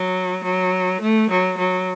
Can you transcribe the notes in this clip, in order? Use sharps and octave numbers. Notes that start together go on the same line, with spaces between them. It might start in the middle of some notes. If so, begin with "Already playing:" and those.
Already playing: F#3
F#3
A3
F#3
F#3